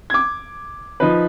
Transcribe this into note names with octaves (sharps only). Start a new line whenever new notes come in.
D6 G#6
F3 D#4 B4